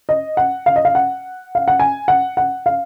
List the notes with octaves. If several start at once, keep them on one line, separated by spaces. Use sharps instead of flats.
D#5
F#5
F5
D#5
F5
F#5
F5
F#5
G#5
F#5
F#5
F5